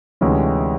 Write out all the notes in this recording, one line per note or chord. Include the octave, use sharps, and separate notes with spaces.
D2 C3 E3 G#3 C#4